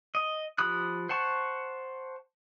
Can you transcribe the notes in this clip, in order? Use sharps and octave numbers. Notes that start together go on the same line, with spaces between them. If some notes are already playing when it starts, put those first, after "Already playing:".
D#5
F3 G4 B5 D#6 F#6
C5 F#5 A5 C#6